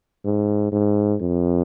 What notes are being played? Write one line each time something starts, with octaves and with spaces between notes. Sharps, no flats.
G#2
G#2
F2